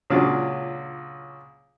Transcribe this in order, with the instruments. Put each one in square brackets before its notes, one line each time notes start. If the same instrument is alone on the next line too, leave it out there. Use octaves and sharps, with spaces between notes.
[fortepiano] C#2 A#2 F#3 D4 F5